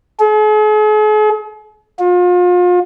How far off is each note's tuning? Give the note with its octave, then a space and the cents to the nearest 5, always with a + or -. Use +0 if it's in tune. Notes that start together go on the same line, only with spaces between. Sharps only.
G#4 +45
F4 +35